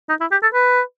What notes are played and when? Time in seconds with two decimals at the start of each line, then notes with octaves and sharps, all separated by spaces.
0.09 D#4
0.20 E4
0.31 G4
0.42 A4
0.54 B4